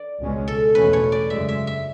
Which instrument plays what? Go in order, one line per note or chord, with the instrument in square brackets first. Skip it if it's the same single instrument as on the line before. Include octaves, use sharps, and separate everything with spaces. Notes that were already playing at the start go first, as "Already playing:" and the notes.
Already playing: [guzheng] D5
[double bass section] C#2 B2 G#3 C#4
[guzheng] A4
[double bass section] E2 B2 A3 C#4 [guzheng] B4
[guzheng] C#5
D5
[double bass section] F#2 C#3 G#3 [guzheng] E5
[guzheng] E5
E5